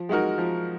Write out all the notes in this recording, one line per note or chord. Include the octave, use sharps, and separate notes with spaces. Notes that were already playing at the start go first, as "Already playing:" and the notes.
Already playing: F3
G#3 D#4 F#4 A#4
F3